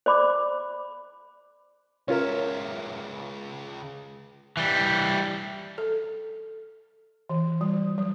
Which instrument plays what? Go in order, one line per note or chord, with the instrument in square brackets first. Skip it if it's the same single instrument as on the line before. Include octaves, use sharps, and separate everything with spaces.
[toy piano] C5 D5 B5 D6
[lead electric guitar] C#2 E5 [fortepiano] C#4 F4 A#4
[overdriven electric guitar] E3 G3
[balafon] A4
E3
G3
F#3